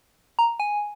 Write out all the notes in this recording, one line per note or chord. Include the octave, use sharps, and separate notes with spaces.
A#5
G#5